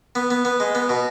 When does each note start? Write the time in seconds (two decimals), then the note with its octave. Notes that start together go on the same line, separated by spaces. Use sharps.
0.15 B3
0.31 B3
0.45 B3
0.60 G#3
0.75 B3
0.89 B2